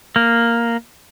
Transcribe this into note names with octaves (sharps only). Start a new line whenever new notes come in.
A#3